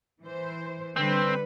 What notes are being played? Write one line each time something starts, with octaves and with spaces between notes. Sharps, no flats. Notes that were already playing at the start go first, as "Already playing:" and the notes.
E3 C5
D3 G3 C4 B4